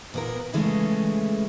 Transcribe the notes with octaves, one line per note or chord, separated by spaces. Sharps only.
A#2 B3 A#4
C#3 E3 G#3 A3 C#4